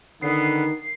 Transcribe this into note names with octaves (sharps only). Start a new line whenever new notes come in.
D3 D#3 B3 C7